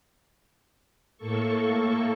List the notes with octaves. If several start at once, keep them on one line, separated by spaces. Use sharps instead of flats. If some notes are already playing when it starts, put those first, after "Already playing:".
A2 A#3 A4 C#6